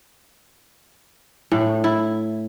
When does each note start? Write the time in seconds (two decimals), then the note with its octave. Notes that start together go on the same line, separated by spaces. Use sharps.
1.52 A2
1.84 E4